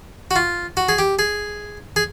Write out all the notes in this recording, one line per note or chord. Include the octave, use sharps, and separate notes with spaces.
F#4
F4
F#4
G#4
G4
G#4
G#4